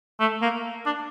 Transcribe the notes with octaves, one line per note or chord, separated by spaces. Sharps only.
A3
A#3
D4